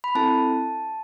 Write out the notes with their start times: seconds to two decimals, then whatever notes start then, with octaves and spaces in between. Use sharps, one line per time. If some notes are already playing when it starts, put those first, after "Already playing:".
0.04 B5
0.15 C4 E4 A4 A5